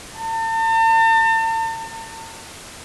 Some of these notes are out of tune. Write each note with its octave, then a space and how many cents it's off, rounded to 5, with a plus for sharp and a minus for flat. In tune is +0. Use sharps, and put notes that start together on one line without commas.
A5 +40